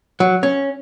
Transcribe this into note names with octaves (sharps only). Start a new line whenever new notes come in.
F#3
C#4